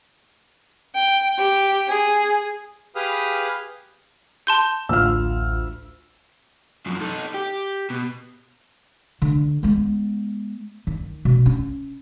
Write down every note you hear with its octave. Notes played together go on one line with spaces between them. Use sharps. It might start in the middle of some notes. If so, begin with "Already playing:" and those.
G5
G4
G#4
G4 G#4 B4 F5 D#6 F6
A5 C6 G6
A1 D2 F4 E6 F6
F#2 F3
D#4 A4
G4
B2
D3
G#3 B3
D#3
B2
C#4